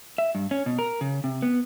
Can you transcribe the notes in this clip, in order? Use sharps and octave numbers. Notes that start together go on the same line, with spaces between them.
E5
G2
C#4
B2
A#4
C#3
C3
B3